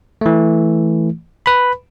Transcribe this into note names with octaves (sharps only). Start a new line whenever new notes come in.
E3 A3
B4 B5